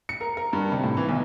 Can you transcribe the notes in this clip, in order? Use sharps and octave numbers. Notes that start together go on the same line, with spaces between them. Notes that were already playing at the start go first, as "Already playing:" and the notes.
C#7
A#4
A#4
G2
C3
A2
E3
B1